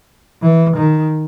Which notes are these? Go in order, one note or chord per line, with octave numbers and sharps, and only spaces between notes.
E3
D#3